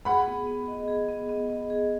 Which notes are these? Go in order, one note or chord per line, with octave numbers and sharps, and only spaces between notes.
G#4 F#5 B5
B3
B3
D#5
G#4
B3
B3
D#5
G#4